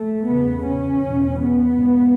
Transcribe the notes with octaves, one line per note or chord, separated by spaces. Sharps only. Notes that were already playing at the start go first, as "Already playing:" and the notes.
Already playing: A3
E2 C#3 B3
C#4
E2 B2
B3
G#2